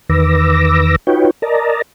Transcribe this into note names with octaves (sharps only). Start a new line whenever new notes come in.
E2 D#3 B4 D6 E6 A#6
D#4 F4 F#4 B4 C#5 G5
A#4 D5 D#5 A5 A#5